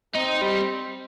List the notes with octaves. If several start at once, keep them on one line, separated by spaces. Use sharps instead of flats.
C4 D#4
G3